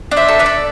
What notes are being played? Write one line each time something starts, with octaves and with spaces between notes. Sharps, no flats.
D4
C5 E5
A4
B4 D5
A4